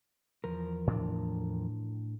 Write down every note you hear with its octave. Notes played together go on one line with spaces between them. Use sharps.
E2 F3 A#4
A2 C#4 D4